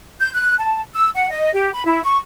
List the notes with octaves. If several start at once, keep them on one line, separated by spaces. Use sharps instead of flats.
G6
F#6
A5
E6
F#5
D#5
G4
B5
E4
C#6